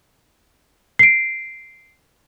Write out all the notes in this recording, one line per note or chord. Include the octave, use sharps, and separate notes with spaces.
C7 D7